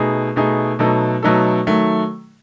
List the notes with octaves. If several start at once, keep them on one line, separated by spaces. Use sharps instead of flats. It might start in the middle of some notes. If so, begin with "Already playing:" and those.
Already playing: B2 A3 D#4 G#4
B2 A3 D#4 G#4
B2 F#3 A3 D#4 A4
B2 F#3 A3 D#4 A4
D#3 F#3 A3